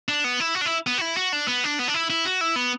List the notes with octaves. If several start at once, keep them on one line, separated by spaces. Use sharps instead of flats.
D4
B3
E4
F#4
D4
E4
B3
F#4
E4
F#4
D4
B3
D4
B3
D4
E4
E4
F#4
E4
B3